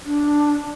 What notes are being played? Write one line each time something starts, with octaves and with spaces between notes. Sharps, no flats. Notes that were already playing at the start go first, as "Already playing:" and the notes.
D4